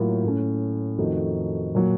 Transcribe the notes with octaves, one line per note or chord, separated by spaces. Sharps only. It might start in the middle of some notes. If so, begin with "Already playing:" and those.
Already playing: A2 F#3 A#3 F4
A2 A3 C#4
F2 D#3 A3 D#4 F#4
A#2 F#3